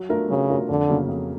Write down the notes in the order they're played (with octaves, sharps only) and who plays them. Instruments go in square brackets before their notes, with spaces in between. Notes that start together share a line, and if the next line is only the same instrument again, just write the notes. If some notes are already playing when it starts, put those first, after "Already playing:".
Already playing: [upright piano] F#3
A3 D4 F4 A#4
[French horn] C#3 [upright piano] F#3
[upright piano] A3 D4 F4 A#4
[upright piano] F2 [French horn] D3
[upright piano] C#3 F#3 A#3
F2